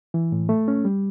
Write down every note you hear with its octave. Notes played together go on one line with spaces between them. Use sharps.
E3
A2
A3
C#4
G3